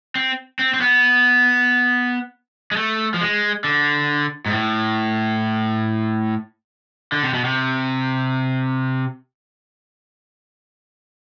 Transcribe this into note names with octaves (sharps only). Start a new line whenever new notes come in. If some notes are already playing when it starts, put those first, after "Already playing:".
C4
C4
C4
B3
G#3
A3
F3
G#3
D3
G#2
A2
D3
C3
B2
C3